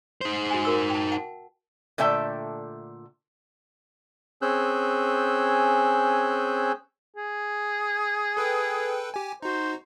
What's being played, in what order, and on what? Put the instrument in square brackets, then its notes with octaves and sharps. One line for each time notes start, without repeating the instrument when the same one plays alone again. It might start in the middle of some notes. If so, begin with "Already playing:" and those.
[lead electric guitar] D#4 C5
[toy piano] F#4 G#5
F#4 A#4 E6
G5 A5
F#5 A5
[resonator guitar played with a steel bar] A#2 D3 A3 E5 G5 A5
[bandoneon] C4 C#4 G#4 E6 F#6 G6
[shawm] G#4
[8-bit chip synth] A4 B4 G5
G4 G#5
[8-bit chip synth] D#4 F#4 [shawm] C5